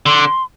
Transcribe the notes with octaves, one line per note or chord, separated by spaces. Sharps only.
D3 C6